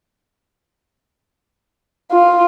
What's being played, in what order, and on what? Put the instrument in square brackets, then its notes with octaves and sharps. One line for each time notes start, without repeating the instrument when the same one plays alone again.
[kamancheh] F4